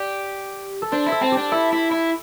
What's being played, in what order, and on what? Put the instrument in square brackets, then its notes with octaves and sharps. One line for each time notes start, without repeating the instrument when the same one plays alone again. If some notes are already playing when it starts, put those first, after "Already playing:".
Already playing: [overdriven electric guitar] G4 [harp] D5
[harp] A4
[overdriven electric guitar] D4 [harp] C5
[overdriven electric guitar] E4
[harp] A4
[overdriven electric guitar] C4
[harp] G4
[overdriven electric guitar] D4
[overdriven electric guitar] E4 [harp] A4
[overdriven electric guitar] E4
E4